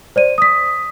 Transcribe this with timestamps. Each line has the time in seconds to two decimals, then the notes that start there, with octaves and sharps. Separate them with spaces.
0.16 C5 D5 D#7
0.38 D#6 B6